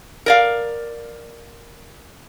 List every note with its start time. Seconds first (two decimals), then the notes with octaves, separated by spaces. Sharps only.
0.26 A#4 D5 F5